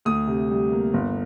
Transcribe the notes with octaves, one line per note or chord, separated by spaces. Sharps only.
D2 D#6
C3
G3
A#3
G1